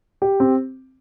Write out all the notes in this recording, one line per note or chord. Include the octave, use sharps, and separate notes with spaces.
G4
C4